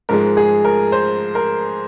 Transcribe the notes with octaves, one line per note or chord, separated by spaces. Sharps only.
G#2 F3 G#3 A#4
G#4
A#4
C5
A#4